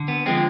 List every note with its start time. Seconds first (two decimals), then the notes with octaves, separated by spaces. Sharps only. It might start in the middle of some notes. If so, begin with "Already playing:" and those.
Already playing: D3
0.08 B3
0.26 D3 F3 G#3 C4